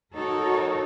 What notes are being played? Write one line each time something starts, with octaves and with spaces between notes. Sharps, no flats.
D#4 F#4 A4 A#4 C#5